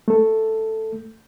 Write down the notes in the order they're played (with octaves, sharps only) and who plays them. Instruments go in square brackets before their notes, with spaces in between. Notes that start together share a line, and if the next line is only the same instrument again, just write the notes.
[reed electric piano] A3 A4